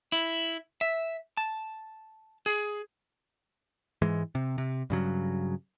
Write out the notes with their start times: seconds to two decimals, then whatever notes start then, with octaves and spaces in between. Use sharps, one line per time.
0.12 E4
0.81 E5
1.37 A5
2.46 G#4
4.02 G#2 E3 G#3
4.35 C3
4.58 C3
4.90 G2 C#3 F#3